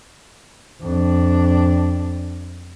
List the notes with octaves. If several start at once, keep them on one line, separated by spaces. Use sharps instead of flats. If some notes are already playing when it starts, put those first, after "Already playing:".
F2 D4